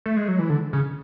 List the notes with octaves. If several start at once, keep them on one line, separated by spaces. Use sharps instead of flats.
A3
G#3
F#3
E3
D3
C#3